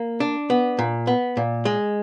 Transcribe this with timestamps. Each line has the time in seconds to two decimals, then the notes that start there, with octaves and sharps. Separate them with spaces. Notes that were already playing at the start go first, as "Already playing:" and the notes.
Already playing: A#3
0.20 D4
0.50 B3
0.79 A#2
1.07 B3
1.37 A#2
1.65 G#3